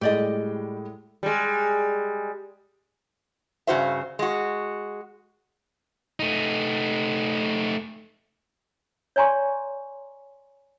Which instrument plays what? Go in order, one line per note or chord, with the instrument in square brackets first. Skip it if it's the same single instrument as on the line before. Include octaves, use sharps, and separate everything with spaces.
[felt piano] A2 G3 G#3 [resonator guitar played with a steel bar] G4 D5 D#5
[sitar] G3 G#3
[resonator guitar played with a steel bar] G2 C#3 F#4 C5 E5
G#3 F#4
[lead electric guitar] A3 D#4
[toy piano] C#5 D5 G#5 A#5 C6 C#6